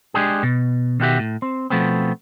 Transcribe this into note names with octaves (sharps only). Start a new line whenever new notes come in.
G#3 D4 G4 G#4
B2
B2 D#3 D#4 F#4 G4 E5
A2
C4
B2 F3 A3 B3 C4